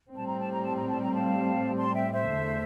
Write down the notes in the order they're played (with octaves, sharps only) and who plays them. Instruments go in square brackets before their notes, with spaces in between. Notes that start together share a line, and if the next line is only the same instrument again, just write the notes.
[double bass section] A2 G3 C4 [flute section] A5
[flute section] A#5
A5
A#5
A5
A#5
A5
A#5
F5 A5
A5 C6
E5 G5
C5 E5
[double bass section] E2 D3 A3